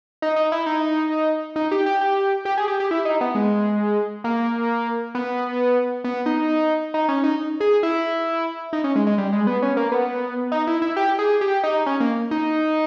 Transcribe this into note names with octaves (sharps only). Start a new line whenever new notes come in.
D#4
D#4
E4
D#4
D#4
G4
G4
G4
G4
G#4
G4
G4
E4
D#4
B3
G#3
A#3
B3
B3
D#4
D#4
C#4
D#4
G#4
E4
D#4
C#4
G#3
G#3
G3
G#3
B3
C#4
A#3
B3
D#4
E4
E4
G4
G#4
G4
D#4
C#4
A#3
D#4